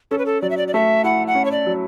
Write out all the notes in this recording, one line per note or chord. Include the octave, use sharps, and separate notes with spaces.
C#4 A4
B4
A4
F#3 D5
E5
D5
D5
A3 E5
E4 F#5
F#5
C#4
C#5
D5
F#3